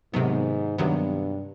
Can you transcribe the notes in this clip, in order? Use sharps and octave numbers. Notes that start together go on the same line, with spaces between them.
G#2 C3 D#3 F#3 B3
G2 C3 D#3 F#3 B3